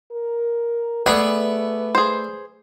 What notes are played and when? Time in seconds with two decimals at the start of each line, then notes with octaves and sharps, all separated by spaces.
0.12 A#4
1.06 A3 B3 G#4 B4 D5 G#5
1.95 G#4 C5